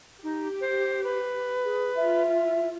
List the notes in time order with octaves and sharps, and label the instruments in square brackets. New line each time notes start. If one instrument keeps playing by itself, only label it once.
[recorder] D#4 [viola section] G4
[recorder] C5
B4
[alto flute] G#4
[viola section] F4 [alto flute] E5